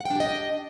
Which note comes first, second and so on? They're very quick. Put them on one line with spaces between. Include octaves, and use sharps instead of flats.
F#5 G5 D4 G4 D#5